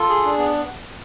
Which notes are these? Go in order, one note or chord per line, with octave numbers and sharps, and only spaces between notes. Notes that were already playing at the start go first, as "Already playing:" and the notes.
Already playing: F4 A4
G#4
D4
B3